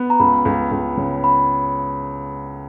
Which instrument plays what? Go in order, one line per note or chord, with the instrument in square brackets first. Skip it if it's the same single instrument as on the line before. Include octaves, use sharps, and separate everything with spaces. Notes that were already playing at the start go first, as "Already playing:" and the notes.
Already playing: [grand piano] B3
[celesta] A#5
[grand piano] C#2 [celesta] B5
[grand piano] C#2
C#2
C#3
[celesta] B5